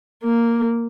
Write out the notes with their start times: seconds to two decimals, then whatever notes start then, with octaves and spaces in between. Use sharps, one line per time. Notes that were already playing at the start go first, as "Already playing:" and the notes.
0.24 A#3